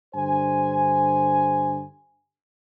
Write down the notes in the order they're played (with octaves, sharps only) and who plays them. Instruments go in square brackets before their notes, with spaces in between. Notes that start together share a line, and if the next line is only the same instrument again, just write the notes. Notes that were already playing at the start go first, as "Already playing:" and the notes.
[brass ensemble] G2 D3 C5 G#5